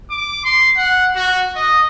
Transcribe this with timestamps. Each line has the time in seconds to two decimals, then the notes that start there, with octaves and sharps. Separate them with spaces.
0.10 D6
0.45 C6
0.77 F#5
1.16 F#4
1.56 D#5